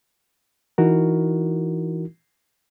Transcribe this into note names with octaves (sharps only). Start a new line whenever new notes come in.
E3 D#4 E4 F#4 A#4